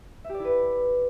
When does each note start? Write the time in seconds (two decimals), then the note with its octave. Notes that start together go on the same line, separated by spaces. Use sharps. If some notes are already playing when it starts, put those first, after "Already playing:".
0.24 E5
0.29 G4
0.34 D5
0.40 E4
0.45 B4